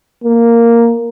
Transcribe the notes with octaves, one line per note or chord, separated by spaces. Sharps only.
A#3